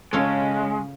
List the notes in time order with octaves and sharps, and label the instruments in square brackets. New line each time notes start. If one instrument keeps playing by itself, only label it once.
[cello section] C#3 C#4 [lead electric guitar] G#3 [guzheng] F4 A4 C#5